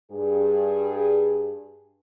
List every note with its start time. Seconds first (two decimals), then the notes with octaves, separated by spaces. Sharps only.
0.10 G2 G#4